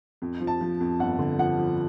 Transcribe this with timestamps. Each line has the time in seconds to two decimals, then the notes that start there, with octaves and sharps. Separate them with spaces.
0.22 F2
0.40 F3
0.47 A5
0.61 F3
0.80 F2
0.99 G1 F#5
1.19 D3
1.38 F3 F#5
1.58 F3